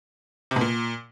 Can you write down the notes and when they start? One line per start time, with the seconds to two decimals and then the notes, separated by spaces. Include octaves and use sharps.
0.51 C3
0.56 B2
0.61 A#2